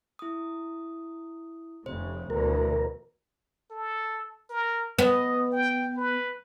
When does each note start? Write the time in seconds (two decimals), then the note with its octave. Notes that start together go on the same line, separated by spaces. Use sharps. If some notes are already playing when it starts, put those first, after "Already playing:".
0.19 E4 D#6
1.86 F1 C#3 C5
2.30 D2 B2 E3 A#4
3.71 A4
4.50 A#4
4.99 B3 D#5
5.52 G5
5.97 B4